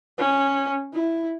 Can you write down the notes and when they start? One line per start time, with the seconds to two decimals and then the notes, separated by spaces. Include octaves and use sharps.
0.18 C#4
0.93 E4